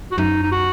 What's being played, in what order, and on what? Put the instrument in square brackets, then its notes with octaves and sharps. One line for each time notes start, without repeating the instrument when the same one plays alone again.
[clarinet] F#4
[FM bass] F#2 [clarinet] D#4
[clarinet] D#4
F#4